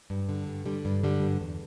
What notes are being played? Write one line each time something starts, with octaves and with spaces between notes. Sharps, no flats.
G2
D3
G2
D3 G3
G2
D3 G3
G2
E2